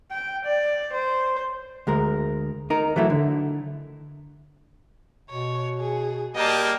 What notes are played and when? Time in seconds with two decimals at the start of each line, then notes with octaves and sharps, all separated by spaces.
0.11 G5
0.45 D5
0.93 C5
1.87 D2 G#3 A#4
2.70 D#4 A#4
2.96 E3 F#3 A3 E4
3.10 D3
5.30 B2 C#5
5.80 G#4
6.35 G3 A#3 D#5 G5 A5